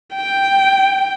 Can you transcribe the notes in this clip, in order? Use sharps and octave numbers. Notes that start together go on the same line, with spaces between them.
G5